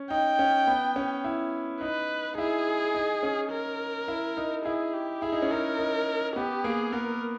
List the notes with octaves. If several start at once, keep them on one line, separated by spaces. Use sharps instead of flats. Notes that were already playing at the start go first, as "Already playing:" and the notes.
Already playing: C#4
D#4 G5
C#4
B3
C#4
E4
D#4 B4
D#4
E4 G#4
D#4
C#4
A#4
E4
D#4
E4 G#4
G4
E4 G#4
D#4
C#4
D#4 A#4
D#4
B3 G4
A#3 G#4
B3 A#4